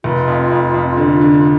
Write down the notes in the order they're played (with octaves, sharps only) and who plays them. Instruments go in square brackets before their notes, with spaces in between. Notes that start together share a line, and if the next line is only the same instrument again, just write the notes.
[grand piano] F1 [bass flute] F4
[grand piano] F2
F2
F2
D3
D3